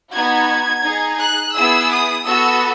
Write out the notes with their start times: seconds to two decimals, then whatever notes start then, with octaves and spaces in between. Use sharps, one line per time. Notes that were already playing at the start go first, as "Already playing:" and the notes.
0.12 B3 D#4 F#4 G#6
0.83 D#4 G#4
1.19 F#6
1.54 B3 E4 G#4 E6
1.90 D#6
2.26 B3 F#4 A4 E6